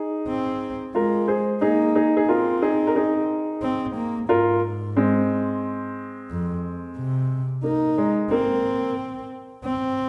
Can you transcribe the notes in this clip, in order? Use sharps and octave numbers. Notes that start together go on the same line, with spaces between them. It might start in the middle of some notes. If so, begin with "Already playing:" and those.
Already playing: D#4 G#4
C4
G#3 F4 A#4
G#4 C5
A#3 D#4 G#4
D#4 G#4
G#4
C4 F4 A#4
D#4 G#4
A#4
D#4 G#4
C4
A#3
G#2 F4 A#4
G#3 C4
F2
C3
A#3 D#4
G#3
A#3 C4
C4